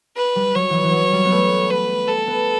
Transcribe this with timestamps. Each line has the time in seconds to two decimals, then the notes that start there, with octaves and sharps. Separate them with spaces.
0.16 B4
0.36 G3
0.55 F#3 C#5
0.70 E3 F#3
0.84 E3
0.93 F#3
1.12 G3
1.25 B3
1.31 A3
1.70 B4
2.08 A4
2.27 B3